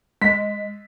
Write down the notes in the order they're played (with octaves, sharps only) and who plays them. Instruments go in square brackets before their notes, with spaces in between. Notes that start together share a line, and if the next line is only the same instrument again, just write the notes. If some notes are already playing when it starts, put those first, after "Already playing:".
[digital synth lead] G#3 [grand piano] B6